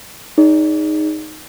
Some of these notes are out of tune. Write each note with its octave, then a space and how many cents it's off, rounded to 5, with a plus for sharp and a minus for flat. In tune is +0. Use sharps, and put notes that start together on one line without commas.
D#4 +0 G#4 +0 D5 -45